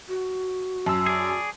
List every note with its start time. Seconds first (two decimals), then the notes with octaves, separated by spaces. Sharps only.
0.08 F#4
0.86 F#2 A5 E6
1.06 G#4 D5